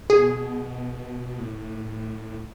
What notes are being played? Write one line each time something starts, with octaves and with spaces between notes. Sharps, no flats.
B2 G#4
A2